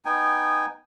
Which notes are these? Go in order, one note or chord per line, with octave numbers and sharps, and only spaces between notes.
B3 D#4 G5 G#5